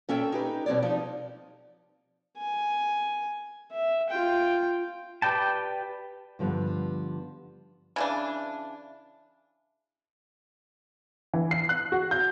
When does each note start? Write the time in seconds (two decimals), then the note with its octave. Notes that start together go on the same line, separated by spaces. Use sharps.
0.09 A#2 C#4 A4 E5 G5
0.32 D#4 G4 B4
0.66 B2 G3 C4 C#5 D5
0.82 F3 D#4
2.38 G#5
3.72 E5
4.10 F4 G5
5.22 G4 B4 D5 G5 A5
6.39 G2 D3 F3 G3 B3
7.96 C#3 E3 D4
11.34 E3
11.51 C7
11.69 F#6
11.92 F#4
12.11 G6